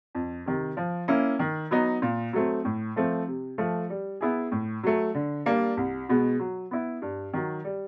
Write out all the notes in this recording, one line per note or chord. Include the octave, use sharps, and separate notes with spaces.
F2
C3 D#3
F3
A#3 C#4 E4
D#3
F#3 B3 D#4
A#2
F#3 A3 C4
A2
F3 A3 C4
C3
F3 A3
G3
B3 E4 G#4
A2
F#3 A3
D3
G3 A#3 D4
C2
B2 G#3 B3
F#3
B3 E4
G2
D#3 F#3
G3